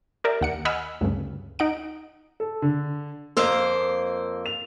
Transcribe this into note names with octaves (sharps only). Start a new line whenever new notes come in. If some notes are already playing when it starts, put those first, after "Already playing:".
G4 A#4 D5 E5
D#2 F#5 C#7
D#5 F#5 G#5 B5 E6 F6
D2 G2 C#3
D#4 F#5 D7
A4
D3
F2 A#3 C5 E6
F7